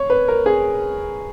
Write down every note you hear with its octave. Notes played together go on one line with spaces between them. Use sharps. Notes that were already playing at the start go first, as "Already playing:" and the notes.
Already playing: C#5
B4
A#4
G#4